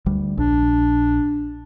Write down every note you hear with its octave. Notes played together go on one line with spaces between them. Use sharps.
D2 G3
A#1 D4